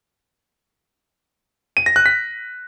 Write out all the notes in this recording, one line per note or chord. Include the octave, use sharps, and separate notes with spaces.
D#7
A#6
F#6
B6